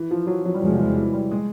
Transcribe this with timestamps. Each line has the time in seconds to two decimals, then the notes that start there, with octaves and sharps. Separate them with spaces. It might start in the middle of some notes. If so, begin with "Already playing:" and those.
Already playing: E3
0.11 F3
0.27 F#3
0.45 F#3
0.54 G3
0.61 E2 C3 F3 F#3 G#3
0.79 E3
0.96 E3
1.13 G3
1.31 G#3